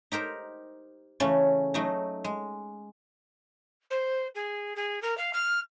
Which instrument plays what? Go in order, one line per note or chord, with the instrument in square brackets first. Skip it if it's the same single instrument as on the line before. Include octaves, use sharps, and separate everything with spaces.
[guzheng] D#4 G4 A#4 C5
C#3 E3 A3 C#4
F#3 A3 D#4
G#3
[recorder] C5
G#4
G#4
A#4
F5
F6